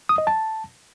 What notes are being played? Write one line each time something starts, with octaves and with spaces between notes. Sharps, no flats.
D#6
D#5
A5